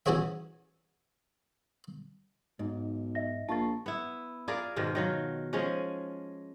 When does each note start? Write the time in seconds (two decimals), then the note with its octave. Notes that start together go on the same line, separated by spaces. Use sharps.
0.06 E3 C#4 F#4 G#4 C#5 E5
2.59 B1 G#2
3.15 D#5 E5 A#6
3.49 A#1 A#3 F4 A5 C#6 A6
3.86 B3 E4
4.48 F4 G#4 A#4 D5
4.76 G#2 B2 D#3 G#3
4.95 D#3 F#3 F4
5.53 F3 G#3 C#4 G#4